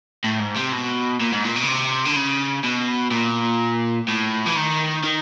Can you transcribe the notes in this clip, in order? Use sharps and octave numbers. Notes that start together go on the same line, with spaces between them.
A2
G#2
C3
B2
A#2
G#2
A#2
B2
C#3
C3
D3
C#3
B2
A#2
A2
E3
D#3
D#3